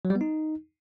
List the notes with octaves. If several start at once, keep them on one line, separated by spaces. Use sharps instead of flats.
F#3
G3
B3
D#4